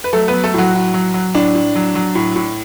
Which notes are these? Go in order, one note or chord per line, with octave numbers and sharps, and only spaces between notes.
B4
F#3 A3 A4
B3 B4
F#3
A3 A4
A2 F#3 F#4
A2
F#3
F#3
A2 D4
A2
F#3
F#3
A2
A2